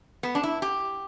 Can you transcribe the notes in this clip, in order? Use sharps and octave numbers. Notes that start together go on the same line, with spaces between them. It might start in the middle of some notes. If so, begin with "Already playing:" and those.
B3
D4
E4
G4